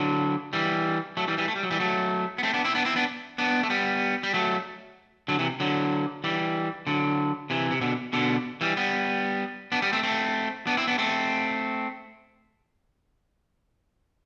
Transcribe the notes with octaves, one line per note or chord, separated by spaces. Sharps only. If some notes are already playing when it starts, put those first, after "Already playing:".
Already playing: D3 F#3
E3 G3
F#3 A3
E3 G3
E3 G3
A3
G3
F#3
E3 G3
F#3 A3
B3
A3 C4
B3 D4
C4 E4
B3 D4
C4 E4
B3 D4
B3 D4
A3
G3 B3
G3
F#3 A3
D3 F#3
C3 E3
D3 F#3
E3 G3
D3 F#3
C3 E3
C3
B2 D3
B2 D3
E3 G3
G3 B3
B3 D4
G3 B3
A3 C4
A3 C4
B3 D4
C4 E4
B3 D4
A3 C4